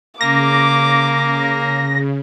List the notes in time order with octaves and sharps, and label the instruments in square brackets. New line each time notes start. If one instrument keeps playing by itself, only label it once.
[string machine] C#3 [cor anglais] A#3 [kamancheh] D6 [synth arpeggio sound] A#6